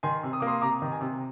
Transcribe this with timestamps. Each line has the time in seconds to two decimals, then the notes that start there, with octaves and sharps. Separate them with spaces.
0.03 D#3 G#5 C6
0.23 C3
0.33 D#6
0.40 A#3 D6
0.47 C6 D#6
0.62 C3 A#5 D6
0.82 D#3
0.92 G#5
1.01 C3